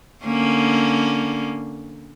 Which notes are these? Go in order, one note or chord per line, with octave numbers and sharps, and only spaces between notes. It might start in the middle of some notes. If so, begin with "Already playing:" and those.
D3 A#3 C#4